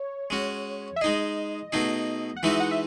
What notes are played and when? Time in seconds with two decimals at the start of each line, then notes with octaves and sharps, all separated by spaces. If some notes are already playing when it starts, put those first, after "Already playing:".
Already playing: C#5
0.30 G#3 C#4 F#4
0.96 E5
1.01 G#3 D#4 G#4 D#5
1.73 B2 A3 D#4 G#4
2.37 F#5
2.43 E3 G#3 D#4 F#4 E5
2.60 F#5
2.71 E5